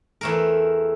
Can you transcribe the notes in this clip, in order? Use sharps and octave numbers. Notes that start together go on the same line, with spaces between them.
E2 A3 A#4